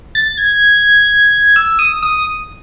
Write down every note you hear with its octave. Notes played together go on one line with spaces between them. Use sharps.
A6
G#6
E6
D#6
D#6